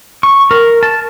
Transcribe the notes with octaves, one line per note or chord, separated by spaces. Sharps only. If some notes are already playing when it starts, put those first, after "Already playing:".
C#6
A#4
A5